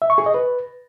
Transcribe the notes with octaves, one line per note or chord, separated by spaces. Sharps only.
E5
C#6
G#4
D#5
B4